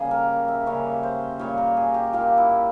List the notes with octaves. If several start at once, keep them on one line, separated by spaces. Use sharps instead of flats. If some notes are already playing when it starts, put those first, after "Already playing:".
Already playing: C#3 G3 A#3 G#4
A#4
E5
C#3 G3 A#3 C#5
C5
A#2 G3 A#3 C#5
A#4
G#4
G4
A#2 G3 A#3 F4
E4